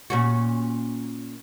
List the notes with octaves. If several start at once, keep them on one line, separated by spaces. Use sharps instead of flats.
A#2 C#4 F#4